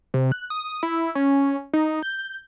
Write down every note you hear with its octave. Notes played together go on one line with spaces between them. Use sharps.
C3
F#6
D#6
E4
C#4
D#4
G6